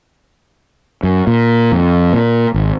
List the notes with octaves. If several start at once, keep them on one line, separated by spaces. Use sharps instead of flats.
F#2
A#2
F2
A#2
G#1